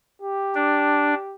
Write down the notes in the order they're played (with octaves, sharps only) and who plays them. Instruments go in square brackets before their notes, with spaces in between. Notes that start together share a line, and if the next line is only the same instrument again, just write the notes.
[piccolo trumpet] G4
[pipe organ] D4